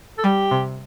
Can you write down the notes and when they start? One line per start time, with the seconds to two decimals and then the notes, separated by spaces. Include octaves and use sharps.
0.18 A4
0.24 G3 G4
0.51 C3